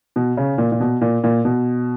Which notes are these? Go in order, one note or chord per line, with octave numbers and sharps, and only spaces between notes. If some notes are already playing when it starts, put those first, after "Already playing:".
B2
C#3
A#2
A#2
B2
A#2
A#2
B2